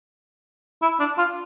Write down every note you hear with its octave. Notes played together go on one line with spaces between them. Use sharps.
E4
D4
F4